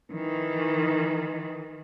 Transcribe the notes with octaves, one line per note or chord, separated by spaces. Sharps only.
D#3 E3